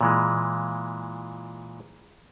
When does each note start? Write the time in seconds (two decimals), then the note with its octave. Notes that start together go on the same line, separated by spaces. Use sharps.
0.01 A#2 E3 G#3